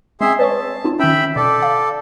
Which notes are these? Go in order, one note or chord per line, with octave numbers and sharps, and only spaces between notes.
G#3 C4 G#4 E5 G5 C6
B4 C#5 A5 C#6
C4 D#4 F4
D#3 C#4 E5 G5 B5
B2 A4 D5
F5